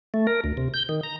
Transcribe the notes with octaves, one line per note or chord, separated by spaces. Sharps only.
A3
A#4
D2
C3
G6
D#3
A#5